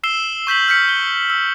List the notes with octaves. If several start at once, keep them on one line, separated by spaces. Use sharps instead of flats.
E6 C7 E7 G7
C#6 G6 B6 F#7
F6 G6 B6 C#7
G7
E6